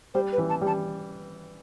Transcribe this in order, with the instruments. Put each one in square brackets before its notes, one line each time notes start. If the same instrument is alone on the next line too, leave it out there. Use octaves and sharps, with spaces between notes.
[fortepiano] G3 [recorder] C5
[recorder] B4
[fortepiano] E3
[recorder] A5
[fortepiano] G3
[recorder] A5